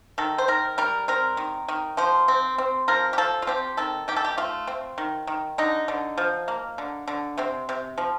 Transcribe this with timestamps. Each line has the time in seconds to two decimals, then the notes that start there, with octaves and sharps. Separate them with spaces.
0.18 D#3 A4
0.38 C5
0.48 D#3 A#4
0.78 G3 A#4
1.08 C4 A#4
1.37 D#3
1.68 D#3
1.97 F3 C5
2.28 C4
2.58 C4
2.88 F3 A#4
3.13 G4
3.18 F3 A4
3.42 F4
3.47 C4 G4
3.77 D#3 A4
4.08 D#3 G4
4.16 A4
4.25 G4
4.38 A3 F4
4.67 C4
4.98 D#3
5.27 D#3
5.58 D3 D#4
5.88 D3
6.17 F3
6.48 A#3
6.78 D3
7.08 D3
7.38 C3 C4
7.69 C3
7.98 F3